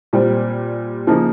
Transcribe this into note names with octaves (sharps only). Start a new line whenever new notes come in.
A#2 G3 C4
C#3 F3 A#3 D#4